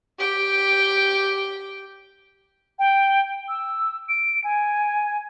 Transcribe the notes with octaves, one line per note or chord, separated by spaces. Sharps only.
G4 G5
G5
E6
D7
G#5